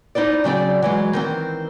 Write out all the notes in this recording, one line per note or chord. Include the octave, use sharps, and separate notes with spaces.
D#4 E4 C5 D5
C#3 F#3 C4 D5
E3 F#3 G#3
D#3 E3 C4